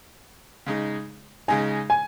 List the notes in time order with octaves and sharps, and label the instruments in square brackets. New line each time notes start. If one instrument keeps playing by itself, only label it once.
[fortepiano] C#3 G#3 D#4
[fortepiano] C#3 G#3 D#4 [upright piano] G#5
[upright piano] G#5